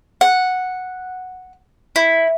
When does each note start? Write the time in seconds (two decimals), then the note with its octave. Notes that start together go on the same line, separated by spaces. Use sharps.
0.21 F#5
1.96 E4